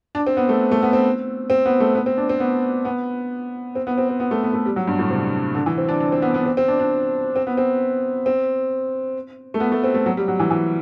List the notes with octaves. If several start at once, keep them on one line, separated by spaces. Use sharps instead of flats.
D4
C4
B3
A3
A3
B3
C4
C4
B3
A3
B3
C4
D4
C4
B3
B3
C4
B3
C4
C4
B3
A3
B3
A3
G3
F#3
G2
A2
C3
D3
E3
C4
D4
D4
C4
B3
B3
C4
C4
D4
D4
C4
B3
C4
C4
A3
B3
A3
C4
A3
F#3
G3
F#3
E3
E3